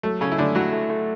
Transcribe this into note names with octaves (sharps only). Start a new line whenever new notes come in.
F#3 A3
C#3 C#4 A4
E4
D3 A3 D4
F#3 E4 F#4
A3
A3